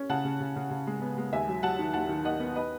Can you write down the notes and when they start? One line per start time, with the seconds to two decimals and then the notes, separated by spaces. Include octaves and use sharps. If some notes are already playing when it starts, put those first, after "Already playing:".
Already playing: C#4
0.10 C#3 F#5 A5
0.25 C#3
0.40 C#3
0.56 C#3
0.71 C#3
0.87 G#3
1.02 B3
1.18 G#3
1.33 D#2 E5 G#5
1.49 F#3
1.63 F#3 F#5 A5
1.79 D#3
1.94 D#2 F#5 A5
2.09 D#3
2.25 D#2 D#5 F#5
2.40 B3
2.56 B4 D#5